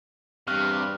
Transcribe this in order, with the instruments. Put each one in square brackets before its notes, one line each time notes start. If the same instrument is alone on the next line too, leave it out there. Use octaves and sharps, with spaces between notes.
[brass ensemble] E2 G2 [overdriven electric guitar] C3 [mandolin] F5 [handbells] C#6 F6 F#6